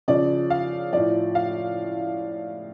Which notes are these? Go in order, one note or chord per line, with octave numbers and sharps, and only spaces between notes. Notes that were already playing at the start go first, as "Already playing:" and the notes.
C#3 F3 D5
F5
A2 F3 D5
F5